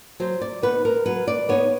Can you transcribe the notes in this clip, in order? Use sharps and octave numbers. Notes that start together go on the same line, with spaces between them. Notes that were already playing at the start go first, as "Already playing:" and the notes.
F#3 C5
D5
B3 D#4 B4
A#4
F#3 B4
D5
B3 D#4 C#5